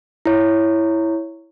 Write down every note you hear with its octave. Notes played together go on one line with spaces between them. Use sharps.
E4 C#5